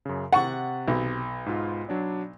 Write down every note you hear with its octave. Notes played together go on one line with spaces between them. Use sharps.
F#2 C#3
C3 F#5 C#6 A6
B1
G#2 F4
F#3 D4 D5